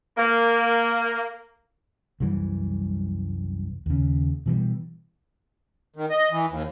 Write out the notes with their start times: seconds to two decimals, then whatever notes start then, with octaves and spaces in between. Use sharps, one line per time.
0.17 A#3
2.20 C2 F#2 E3 G3
3.86 D#2 C#3
4.46 B2 E3 F3 G3
5.96 D#3
6.10 D#5
6.31 E3
6.50 D#2